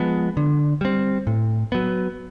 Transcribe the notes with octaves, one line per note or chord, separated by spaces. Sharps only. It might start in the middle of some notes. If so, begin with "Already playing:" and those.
Already playing: F3 G#3 B3
D3
G3 C4
A2
F#3 B3